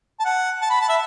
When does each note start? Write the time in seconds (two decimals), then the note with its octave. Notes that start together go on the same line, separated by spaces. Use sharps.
0.20 A5
0.25 F#5
0.62 A5
0.70 B5
0.80 A5
0.89 E5